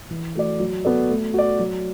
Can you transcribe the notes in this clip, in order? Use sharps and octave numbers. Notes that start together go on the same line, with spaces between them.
E3
A3 F#4 D5
F#3
B3 F#4 A4 D5
A3
F#4 D5
F#3